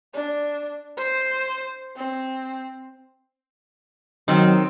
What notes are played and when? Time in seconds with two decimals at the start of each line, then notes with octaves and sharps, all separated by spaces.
0.14 D4
0.97 C5
1.96 C4
4.28 D#3 F#3 C4